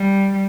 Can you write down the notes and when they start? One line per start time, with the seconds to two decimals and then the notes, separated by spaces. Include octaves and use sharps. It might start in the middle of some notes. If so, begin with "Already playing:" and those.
Already playing: G3